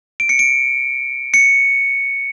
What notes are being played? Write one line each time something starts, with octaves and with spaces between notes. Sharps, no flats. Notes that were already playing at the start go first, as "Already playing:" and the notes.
D7
C#7
D7
C#7